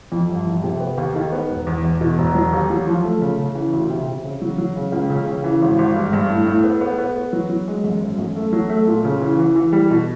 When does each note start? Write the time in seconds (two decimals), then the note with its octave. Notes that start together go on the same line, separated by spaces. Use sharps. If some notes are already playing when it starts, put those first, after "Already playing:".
0.12 F2
0.30 G1
0.47 F2
0.64 C3
0.80 B3
0.98 D#2
1.15 D#3
1.32 B3
1.50 E1
1.66 E2
1.84 E2
2.01 B2
2.18 E1
2.35 F#3
2.53 D#2
2.70 F#3
2.87 F3
3.04 A3
3.21 C#3
3.39 C#3
3.55 E3
3.73 D2
3.90 C3
4.07 C3
4.24 C#3
4.42 F#3
4.58 F#3
4.76 C#3
4.92 C#2
5.10 C#3
5.27 C#3
5.44 E3
5.62 G#1
5.79 G#1
5.96 G2
6.13 G2
6.30 A2
6.47 A2
6.64 B3
6.81 B3
6.98 B3
7.16 B3
7.33 F#3
7.49 F#3
7.68 G#3
7.84 F#2
8.02 G#1
8.19 F#2
8.36 A3
8.53 F#3
8.70 A3
8.87 A#2
9.05 C#3
9.22 E3
9.39 E3
9.56 E3
9.72 G3
9.91 B2